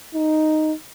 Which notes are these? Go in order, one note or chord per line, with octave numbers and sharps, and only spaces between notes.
D#4